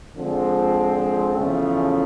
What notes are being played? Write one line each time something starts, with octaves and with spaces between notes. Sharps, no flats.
D3 F3 G#3 C4
E2 C#3 F3 A3 C#4